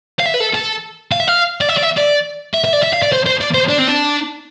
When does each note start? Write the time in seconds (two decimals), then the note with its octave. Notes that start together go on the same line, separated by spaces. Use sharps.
0.20 F5
0.26 E5
0.34 B4
0.40 A4
0.55 A4
1.12 F5
1.20 E5
1.28 F5
1.61 D5
1.69 E5
1.78 D5
1.83 E5
1.98 D5
2.54 E5
2.65 E5
2.73 D5
2.83 E5
2.93 F5
3.03 D5
3.12 C5
3.26 C5
3.41 D5
3.54 C5
3.69 D4
3.79 C4
3.88 D4